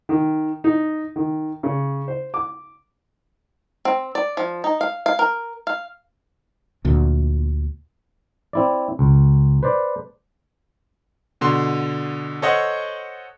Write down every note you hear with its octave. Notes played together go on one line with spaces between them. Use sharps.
D#3
D#4
D#3
C#3
C5
D6
C4
D5
F3
D#4
F5
F5
A#4
F5
D2 A#2
C4 E4 D5
C#2
B4 C5 D5
B2 D3 C6
A4 C5 C#5 D#5 F#5